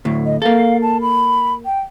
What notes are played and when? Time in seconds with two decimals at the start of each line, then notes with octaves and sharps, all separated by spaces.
0.05 D2 A2
0.26 D#5
0.42 A#3 A4 F5
0.82 A5
1.01 B5
1.65 G5